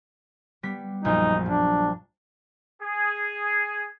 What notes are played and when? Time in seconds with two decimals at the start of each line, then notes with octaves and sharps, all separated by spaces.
0.63 G3 B3 B6
1.05 A#1 F#2 D#4
1.46 G2 D4
2.82 G#4